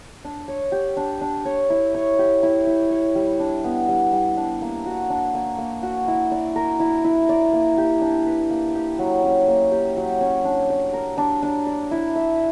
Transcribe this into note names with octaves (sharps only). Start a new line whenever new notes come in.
D4
C#5
G4
D4
D4
C#5
E4
C#5
G4
E4
E4
C#5
G3
D4
B3
G3
G3
D4
A#3
F#4
D4
A#3
A#3
F#4
E4
D5
A#4
E4
E4
D5
A#3
G4
D4
B4
A#3
G4
F#3
C#4
A#3
G4
F#3
C#4
D4
D5
A#4
D4
D4
D5
E4
E5